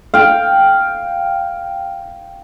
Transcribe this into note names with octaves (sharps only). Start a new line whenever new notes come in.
F5 G5